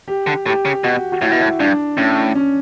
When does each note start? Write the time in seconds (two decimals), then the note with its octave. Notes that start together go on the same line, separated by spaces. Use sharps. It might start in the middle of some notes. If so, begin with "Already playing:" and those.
0.08 G4
0.27 D3
0.46 A2 G4
0.65 C#3
0.84 B2 F#4
1.12 F#4
1.22 A2 E4
1.32 B2
1.42 A2
1.60 G2 D4
1.97 A2 C#4
2.35 C#4